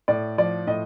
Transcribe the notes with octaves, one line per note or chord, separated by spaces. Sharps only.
A2 D5
F3 D5
A2 D#5